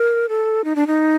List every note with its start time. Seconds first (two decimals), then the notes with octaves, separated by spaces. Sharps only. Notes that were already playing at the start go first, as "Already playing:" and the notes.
Already playing: A#4
0.29 A4
0.64 D#4
0.76 D4
0.87 D#4